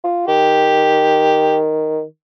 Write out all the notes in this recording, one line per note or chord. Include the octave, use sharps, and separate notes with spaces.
F4
D#3 G4